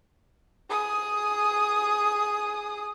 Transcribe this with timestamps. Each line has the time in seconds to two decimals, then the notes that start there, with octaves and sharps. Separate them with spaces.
0.70 G#4 D#6